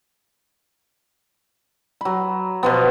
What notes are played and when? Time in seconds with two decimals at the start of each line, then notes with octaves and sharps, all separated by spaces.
2.01 F#3 B5
2.63 B2 F3 B3